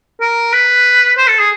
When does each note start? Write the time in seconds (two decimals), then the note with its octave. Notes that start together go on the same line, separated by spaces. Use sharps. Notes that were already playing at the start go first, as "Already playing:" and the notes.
0.21 A#4
0.53 B4
1.18 C5
1.28 A4
1.40 G#4